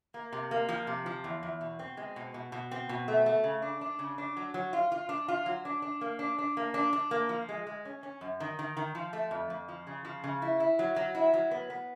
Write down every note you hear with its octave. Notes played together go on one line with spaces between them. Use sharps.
A#3
C3
A#3
F3
C3
F3
E2
E2
B2
C4
G#3
B2
B2
B2
C4
B2
A3
A3
C#3
D4
D4
C#3
D4
F#3
F#3
F4
F4
D4
F4
F#3
D4
D4
A#3
D4
D4
A#3
D4
D4
A#3
F3
G#3
G#3
C#4
C#4
F#2
D#3
D#3
D#3
F3
A3
F2
F2
F3
C#3
F3
C#3
E4
E4
F#3
F#3
E4
F#3
B3
B3